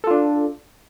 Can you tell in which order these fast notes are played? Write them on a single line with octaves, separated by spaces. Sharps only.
A4 F4 D4